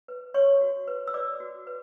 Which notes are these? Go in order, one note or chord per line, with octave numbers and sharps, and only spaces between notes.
B4
B4 C#5 C#6
F#4
B4
E6
B4 D5 D6
F#4
B4